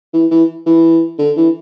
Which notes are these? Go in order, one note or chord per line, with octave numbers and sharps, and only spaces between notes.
E3
E3
E3
D3
E3